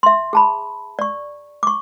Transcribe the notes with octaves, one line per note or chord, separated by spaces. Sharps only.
E5 C6
G#4 A5 B5
D5 C#6
C#6 D6